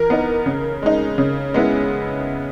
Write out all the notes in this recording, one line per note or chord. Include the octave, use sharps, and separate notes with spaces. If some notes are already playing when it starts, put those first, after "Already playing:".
Already playing: E3 A#4
B3 D#4
C#3
G#3 D#4
C#3
G#3 B3 E4